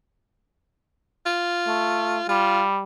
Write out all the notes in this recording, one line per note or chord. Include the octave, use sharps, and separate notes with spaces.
F4
A3
G3 F4